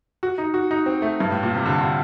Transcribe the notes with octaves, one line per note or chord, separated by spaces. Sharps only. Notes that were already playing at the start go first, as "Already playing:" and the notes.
F#4
D#4
F#4
D#4
C4
A3
G2
A2
A#2
C3
D3
D3